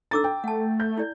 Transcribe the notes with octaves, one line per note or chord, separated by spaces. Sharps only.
D4 A4 A#5 D6 E6 A6
G5
A3 F#5 A5
G6
E4 D5